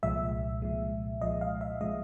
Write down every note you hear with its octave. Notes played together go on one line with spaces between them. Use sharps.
C2 A#2 F3 G#3 E5
C2 A#2 F3 G#3
C2 A#2 F3 G#3 D#5
F5
E5
A#2 F3 G#3 D#5